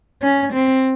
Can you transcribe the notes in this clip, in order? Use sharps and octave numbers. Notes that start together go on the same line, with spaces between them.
C#4
C4